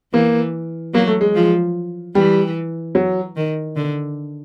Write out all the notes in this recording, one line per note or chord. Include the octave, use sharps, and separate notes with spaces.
E3 A#3
F#3 A#3
A3
G#3
F3
E3 G3
F#3
D#3
D3